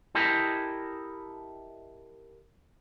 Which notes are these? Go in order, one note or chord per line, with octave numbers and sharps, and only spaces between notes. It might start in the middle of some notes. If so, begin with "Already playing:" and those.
E4 G4 A4 A#4 D#5